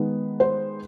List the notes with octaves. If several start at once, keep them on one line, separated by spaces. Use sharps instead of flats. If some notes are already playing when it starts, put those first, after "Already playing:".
Already playing: D#3 G#3 B3
C5